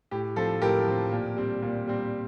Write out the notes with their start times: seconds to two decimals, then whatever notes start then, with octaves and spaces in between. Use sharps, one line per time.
0.11 A2 G4
0.36 F3 C4 A4
0.62 A2 G4 A#4
0.87 F3 C4
1.12 A#2
1.37 G3 C4
1.62 A#2
1.87 G3 C4